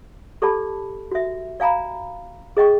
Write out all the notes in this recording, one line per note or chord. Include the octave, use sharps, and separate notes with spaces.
G4 A4 D5 A5 B5
F#4 E5
D5 F5 G#5 A#5 B5
G#4 D#5 G5 C#6